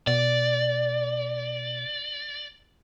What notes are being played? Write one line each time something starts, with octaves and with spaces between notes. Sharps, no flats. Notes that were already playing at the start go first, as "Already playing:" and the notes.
B2 D5